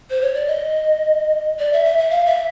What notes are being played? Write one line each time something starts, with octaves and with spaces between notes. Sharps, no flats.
C5
C#5
D5
D#5
D5
E5
E5
E5
F5
E5